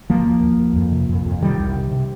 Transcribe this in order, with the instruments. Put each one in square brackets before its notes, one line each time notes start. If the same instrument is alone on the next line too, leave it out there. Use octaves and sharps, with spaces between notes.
[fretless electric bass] D#2 F3 A#3
D#2
D#2
D#2
F2
C3
F2
F2
C3 D#3 G3
C2
C3
C3